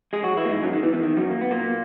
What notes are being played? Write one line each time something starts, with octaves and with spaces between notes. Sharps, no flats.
G#3 G#4
F#3 F#4
E3 E4
A#3
G#2 G#3
F#2 F#3
D#3
E2 E3
E2 E3
D#3
F#2 F#3
A#3
B3
A#2 A#3